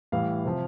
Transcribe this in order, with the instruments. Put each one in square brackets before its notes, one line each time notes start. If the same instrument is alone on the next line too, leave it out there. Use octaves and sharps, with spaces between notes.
[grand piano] A2 E3 G3 F5
C3 F3